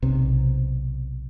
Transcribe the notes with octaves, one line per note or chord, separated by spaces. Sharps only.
B1 C3